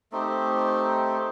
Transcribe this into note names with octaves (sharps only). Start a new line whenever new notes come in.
A3 C4 D#4 G4